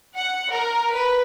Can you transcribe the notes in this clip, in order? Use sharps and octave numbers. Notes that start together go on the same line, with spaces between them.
F#5
A#4
B4